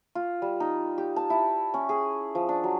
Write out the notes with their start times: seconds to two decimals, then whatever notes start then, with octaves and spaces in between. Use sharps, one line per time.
0.15 F4
0.42 G3
0.60 D#4
0.98 G4
1.16 A5
1.30 E4
1.74 C#4
1.89 G#4
2.35 F3
2.49 D4
2.64 F#3